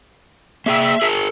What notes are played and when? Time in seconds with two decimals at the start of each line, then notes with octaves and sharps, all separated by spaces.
0.66 A#3 G#4 E5 G5
1.02 G#4 A#4